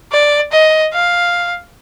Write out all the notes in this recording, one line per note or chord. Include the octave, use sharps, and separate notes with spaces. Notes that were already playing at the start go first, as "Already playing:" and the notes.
D5
D#5
F5